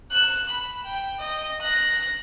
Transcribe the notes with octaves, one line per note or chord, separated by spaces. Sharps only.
F#6 E7
B5
G5
D#5
F#6 A#6